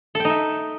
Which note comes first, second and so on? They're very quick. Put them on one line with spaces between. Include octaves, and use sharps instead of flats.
A4 G5 D#4 E5